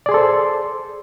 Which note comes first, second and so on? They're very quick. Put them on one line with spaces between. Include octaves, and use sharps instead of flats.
D5 G#4 C6 A4 C5